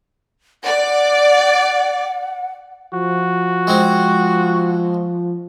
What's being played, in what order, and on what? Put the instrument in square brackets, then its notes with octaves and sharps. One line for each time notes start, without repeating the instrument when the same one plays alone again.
[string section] D5 [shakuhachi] F#5
[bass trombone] F3 [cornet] F#4
[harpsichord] G#3 C4